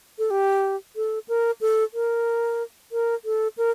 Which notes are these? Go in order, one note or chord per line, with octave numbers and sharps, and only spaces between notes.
A4
G4
A4
A#4
A4
A#4
A#4
A4
A#4